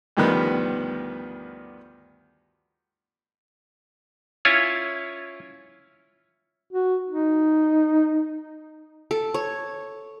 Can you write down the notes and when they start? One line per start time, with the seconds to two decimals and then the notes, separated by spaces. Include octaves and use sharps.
0.17 D2 G2 D#3 F3 B3
4.45 C#4 E4 F4 C#5 G#5
6.72 F#4
7.08 D#4
9.11 A4
9.34 C#5